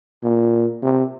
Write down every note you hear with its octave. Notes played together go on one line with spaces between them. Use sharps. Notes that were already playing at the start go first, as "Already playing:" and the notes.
A#2
C3